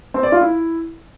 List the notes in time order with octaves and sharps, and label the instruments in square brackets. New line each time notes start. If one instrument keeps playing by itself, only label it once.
[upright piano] C4
D5
F4
E4